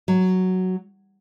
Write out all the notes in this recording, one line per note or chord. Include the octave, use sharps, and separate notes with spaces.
F#3